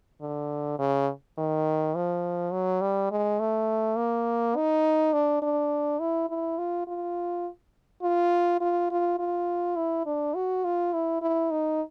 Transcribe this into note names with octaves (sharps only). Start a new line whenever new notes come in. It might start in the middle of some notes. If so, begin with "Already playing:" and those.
D3
C#3
D#3
F3
F#3
G3
G#3
A3
A#3
D#4
D4
D4
E4
E4
F4
F4
F4
F4
F4
F4
E4
D4
F#4
F4
E4
E4
D#4